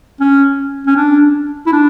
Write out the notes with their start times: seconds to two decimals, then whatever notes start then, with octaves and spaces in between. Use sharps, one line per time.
0.20 C#4
0.87 C#4
0.97 D4
1.67 E4
1.72 D4